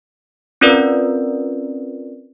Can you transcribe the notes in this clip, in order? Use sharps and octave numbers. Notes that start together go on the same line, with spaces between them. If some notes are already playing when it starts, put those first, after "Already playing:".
C4 C#4 F4 A#4 B4 D5